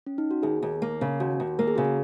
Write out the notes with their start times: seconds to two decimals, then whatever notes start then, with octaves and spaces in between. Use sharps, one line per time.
0.06 C#4
0.18 D#4
0.31 F#4
0.43 D#2 G#4
0.63 D#2
0.82 A#3
1.01 C#3
1.20 D#2 F#4
1.40 D#2
1.59 A#3 A#4
1.68 G#4
1.75 C#3 F#4
1.85 G#4